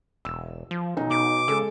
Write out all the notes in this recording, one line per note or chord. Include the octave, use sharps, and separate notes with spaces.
E1 E6
F3
B1 D#4
B2 D6
C#3 G#3 A4 E6